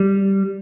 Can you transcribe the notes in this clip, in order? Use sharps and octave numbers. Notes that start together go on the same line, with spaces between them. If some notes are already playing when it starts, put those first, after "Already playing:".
Already playing: G3